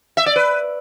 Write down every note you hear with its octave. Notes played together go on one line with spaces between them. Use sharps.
E5
D5
B4